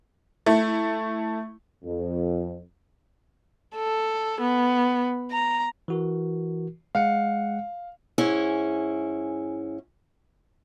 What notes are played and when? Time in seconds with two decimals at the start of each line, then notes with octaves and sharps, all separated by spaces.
0.46 A3 E4
1.84 F2
3.76 A4
4.41 B3
5.32 A#5
5.88 E3 F#4 A#4
6.95 G#3 F5 F#5 C#7
8.18 G#2 C#4 E4 G#4